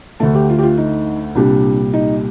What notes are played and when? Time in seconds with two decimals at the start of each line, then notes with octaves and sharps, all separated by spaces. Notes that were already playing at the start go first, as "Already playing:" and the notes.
0.20 D2 D3 A3 A4
0.35 G4
0.50 F4
0.59 G4
0.63 F4
0.77 D#4
1.35 C2 A#2 G3 D4
1.93 D#4